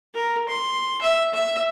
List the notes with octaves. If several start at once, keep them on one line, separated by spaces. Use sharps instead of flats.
A#4
C6
E5
E5